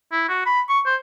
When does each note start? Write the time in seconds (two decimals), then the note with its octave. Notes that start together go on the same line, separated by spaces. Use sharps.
0.12 E4
0.29 F#4
0.46 B5
0.69 C#6
0.86 C5